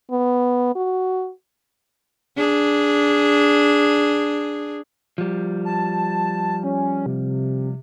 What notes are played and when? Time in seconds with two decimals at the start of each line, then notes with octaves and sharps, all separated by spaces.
0.11 B3
0.75 F#4
2.36 D4 G#4
5.18 F3 G3
5.65 A5
6.63 C#4
7.06 C3